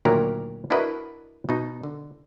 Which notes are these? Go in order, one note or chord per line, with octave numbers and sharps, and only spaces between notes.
D2 A#2 D#3 F#3 G4 A#4
D4 E4 F#4 A#4 B4 D#5
B2 D#4
D3